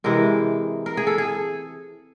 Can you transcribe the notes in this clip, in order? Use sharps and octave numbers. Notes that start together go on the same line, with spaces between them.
C3 E3 G#3 A#4
A#4
G#4
A4
G#4